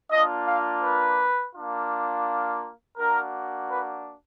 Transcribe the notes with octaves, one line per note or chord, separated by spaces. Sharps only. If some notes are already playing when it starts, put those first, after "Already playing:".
A#3 D4 F4 D#5
F5
B4
A#3 D4 F4
A#3 D4 F#4 A#4
B4